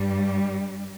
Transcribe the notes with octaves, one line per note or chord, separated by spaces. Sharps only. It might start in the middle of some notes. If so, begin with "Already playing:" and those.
Already playing: G2 G3